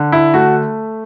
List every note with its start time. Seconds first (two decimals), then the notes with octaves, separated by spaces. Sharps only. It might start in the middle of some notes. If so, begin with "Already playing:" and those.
Already playing: D3
0.12 E4
0.34 A3 F#4